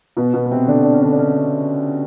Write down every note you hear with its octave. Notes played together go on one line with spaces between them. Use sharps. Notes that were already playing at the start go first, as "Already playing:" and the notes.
B2 B3
B2 B3
B3
C3 C4
D3 D4
D4
C#4
D3 D4
D4
C#3 C#4